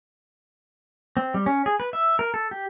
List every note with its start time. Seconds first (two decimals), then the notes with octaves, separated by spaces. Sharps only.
1.17 C4
1.34 G3
1.46 C#4
1.66 G#4
1.80 B4
1.93 E5
2.19 A#4
2.34 A4
2.51 G4